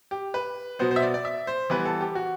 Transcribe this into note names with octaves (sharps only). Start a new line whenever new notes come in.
G4
B4
B2 F#3 B3 C5
C5
E5
D5
D5
E5
C5
E3 G3 B3 B4
A4
G4
F#4